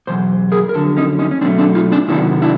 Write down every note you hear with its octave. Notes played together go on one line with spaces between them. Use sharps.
E2 B2 F#3 C5
G#4 A#4
A#4
F2 D3 F#3 A4
C#4 D#4
C#4 D#4
C#4
B2 F#3 A3 C4 D4
C4 D4
D#4 F4
C4 D4
C3 D#3 F#3 B3 D4 E4
D4 E4